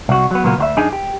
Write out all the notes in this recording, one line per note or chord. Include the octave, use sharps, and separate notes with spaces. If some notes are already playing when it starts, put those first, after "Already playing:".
C2 F#4
F#3 B3
A#2 C#3 F#3 A#3 B3
D2 F#4 E5
F#2 D4 D#4 G#4 D#5 G#5
G4